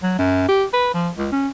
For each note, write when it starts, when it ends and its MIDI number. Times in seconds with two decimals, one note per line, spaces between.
0.03 0.16 54
0.18 0.46 42
0.48 0.64 67
0.73 0.91 71
0.94 1.10 53
1.16 1.30 37
1.32 1.48 61